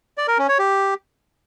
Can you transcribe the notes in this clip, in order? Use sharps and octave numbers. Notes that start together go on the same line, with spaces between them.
D5
A#4
C#4
C#5
G4